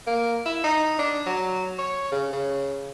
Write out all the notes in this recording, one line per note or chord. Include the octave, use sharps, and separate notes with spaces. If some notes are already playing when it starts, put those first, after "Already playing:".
A#3
E4
D#4
D4
F#3
C#5
C#3
C#3